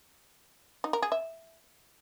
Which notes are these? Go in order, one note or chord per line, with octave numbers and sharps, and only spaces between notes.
D#4
A#4
G#4
E5